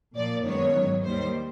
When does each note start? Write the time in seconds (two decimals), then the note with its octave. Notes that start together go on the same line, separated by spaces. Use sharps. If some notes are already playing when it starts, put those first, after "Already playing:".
0.15 A#2 F3 A#3 D5
0.45 F#2 D#3 G#3 B3 C#5
0.75 G#2 D#3 F#3
1.04 D#2 D#3 G3 C5